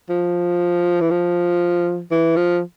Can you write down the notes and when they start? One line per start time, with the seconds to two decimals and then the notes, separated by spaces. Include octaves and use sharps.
0.10 F3
1.01 E3
1.11 F3
2.11 E3
2.37 F3